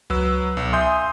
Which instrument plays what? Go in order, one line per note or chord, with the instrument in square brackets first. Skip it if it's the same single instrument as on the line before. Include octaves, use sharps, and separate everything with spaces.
[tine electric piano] C#2 [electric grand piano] F#3 B4 E6
[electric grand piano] B1
[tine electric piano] E5 G#5 [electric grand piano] C6 D#6 G6